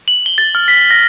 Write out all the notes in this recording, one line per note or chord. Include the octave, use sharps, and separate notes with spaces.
F#7
G7
A6
F6
B6
A#6